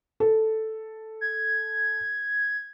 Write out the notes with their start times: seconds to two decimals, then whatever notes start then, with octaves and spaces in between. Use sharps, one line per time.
0.20 A4
1.21 G#6